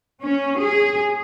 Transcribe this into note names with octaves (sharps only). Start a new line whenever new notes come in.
C#4
G#4